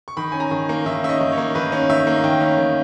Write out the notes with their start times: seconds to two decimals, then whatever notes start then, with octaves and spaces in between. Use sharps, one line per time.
0.08 C#6
0.17 D#3 B5
0.32 C#4 G#5
0.40 A#5
0.51 D#3
0.69 A#3
0.86 D#3 E5
1.03 C#4 E5
1.09 D#5
1.21 D#3
1.32 C#5
1.38 A#3
1.55 D#3 B4
1.72 C#4
1.90 D#3 E5
2.07 A#3
2.24 D#3 G5
2.41 C#4
2.58 D#3